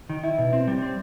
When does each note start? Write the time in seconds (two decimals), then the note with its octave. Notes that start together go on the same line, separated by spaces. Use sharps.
0.10 D#3
0.23 E4
0.38 B2
0.53 C4
0.68 G3
0.82 C4